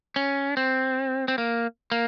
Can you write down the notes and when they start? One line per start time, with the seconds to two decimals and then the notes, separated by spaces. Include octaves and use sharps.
0.16 C#4
0.57 C4
1.28 C4
1.38 A#3
1.92 A#3